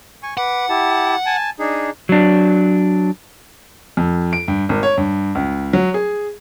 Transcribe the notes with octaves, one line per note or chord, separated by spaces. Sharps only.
G#5 C#6
B4 F#5 D6
E4 G4 A5
G#5 A5
D4 D#4 G#4
F#3 D4
F2
D7
G2
G#1
C#5
G2
C#2
F#3
G#4